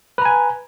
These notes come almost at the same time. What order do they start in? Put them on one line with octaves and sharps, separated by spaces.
B4 A#5 G#5